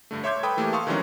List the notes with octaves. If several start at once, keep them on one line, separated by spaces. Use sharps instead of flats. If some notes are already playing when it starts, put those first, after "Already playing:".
G2 D3 A3
C#5 E5 C6 D6 G6 G#6
A4 B4 G5 B5 D#6
E3 A3 A#3 G4
A4 F5 C6 C#6 D#6
D#3 E3 F#3 G#3 C#4 D4